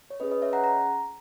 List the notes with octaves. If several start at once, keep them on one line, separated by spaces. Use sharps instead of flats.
C#5
C#4 G#4 B4 D#5
B4 D#5
C#5 E5
F#5 A#5
A#5